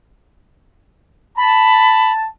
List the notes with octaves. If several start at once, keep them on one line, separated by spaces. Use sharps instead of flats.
A5 B5